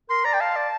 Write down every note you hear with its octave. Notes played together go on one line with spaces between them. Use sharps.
A#4 C6
D5 A#5
G5
F5 A5
D5